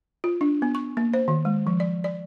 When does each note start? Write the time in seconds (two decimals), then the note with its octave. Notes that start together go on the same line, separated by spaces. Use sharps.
0.24 F4
0.41 D4
0.62 B3
0.75 C#6
0.97 A#3
1.14 C5
1.28 D#3
1.45 G#3
1.67 F3
1.80 D5
2.04 D5